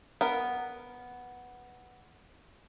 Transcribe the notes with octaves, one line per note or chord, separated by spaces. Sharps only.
B3 A#4